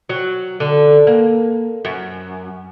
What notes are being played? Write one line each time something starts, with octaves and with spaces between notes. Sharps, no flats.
F#3
D3
A#3
F#2